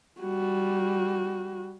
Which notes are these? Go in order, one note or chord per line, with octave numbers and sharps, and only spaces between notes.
G3 F#4